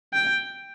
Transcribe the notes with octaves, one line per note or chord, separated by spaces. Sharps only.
G5